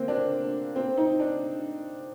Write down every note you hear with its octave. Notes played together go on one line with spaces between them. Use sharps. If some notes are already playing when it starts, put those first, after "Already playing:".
Already playing: D3 A#3 C4
D4
C4
D#4
D4